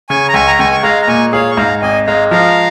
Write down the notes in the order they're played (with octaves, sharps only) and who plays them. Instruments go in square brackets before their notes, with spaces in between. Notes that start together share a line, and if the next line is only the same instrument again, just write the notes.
[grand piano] C#3 [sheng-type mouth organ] G#5 C#6
[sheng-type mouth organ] A#5
[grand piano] C#2 [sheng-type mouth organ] G#5 C#6
[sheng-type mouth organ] A#5
[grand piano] C#2 [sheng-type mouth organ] G#5 C#6
[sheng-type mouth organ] C#6
[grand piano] G#3 [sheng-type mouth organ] F5 A#5
[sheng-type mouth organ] A#5
[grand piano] A#2 [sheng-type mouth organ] G#5 C#6
[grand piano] G#4 [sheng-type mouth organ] C#5 F5
[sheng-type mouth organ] C#6
[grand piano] G#2 [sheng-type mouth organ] F5 A#5
[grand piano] G#1 [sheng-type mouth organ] D#5 G#5
[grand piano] G#3 [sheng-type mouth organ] F5 A#5
[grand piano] F3 [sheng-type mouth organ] F5 A#5